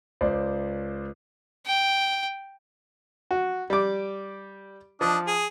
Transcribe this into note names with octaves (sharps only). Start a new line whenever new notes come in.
C#2 C5 D5
G5
F#4
G3 D6
F3 D4 D#5
G#4